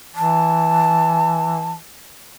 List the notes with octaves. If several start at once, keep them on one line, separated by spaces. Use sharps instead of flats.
E3 A5